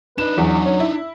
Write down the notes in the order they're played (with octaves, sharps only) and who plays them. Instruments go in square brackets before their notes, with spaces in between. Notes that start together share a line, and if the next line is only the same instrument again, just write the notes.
[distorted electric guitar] D4 D#4 [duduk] B4 [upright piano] E7
[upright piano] E2 [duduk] F#3
[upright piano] C#4
E4